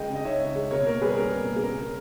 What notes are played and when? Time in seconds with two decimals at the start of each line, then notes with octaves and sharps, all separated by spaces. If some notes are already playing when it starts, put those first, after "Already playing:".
Already playing: C#2 G#3 D#5 G5
0.09 C#3
0.15 D#5
0.25 D#4 C#5 E5
0.41 C#2
0.56 G#3
0.71 B2 A#4 C#5
0.87 A#3 A#4
1.02 G3 G#4 B4
1.12 B4
1.17 C#4 A#4
1.33 B2
1.49 A#3
1.56 G#4
1.63 C#3 A#4
1.78 C#4